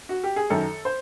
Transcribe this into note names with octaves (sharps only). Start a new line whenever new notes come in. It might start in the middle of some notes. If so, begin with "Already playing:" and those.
F#4
G4
G#4
F#2 D#3 A4
C5